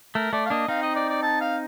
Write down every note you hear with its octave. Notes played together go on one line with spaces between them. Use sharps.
A3 A#4
A3 D5
F5
A#3 D4 D#5
C4 D#4 F5
D#5
D5
D5
A5
F5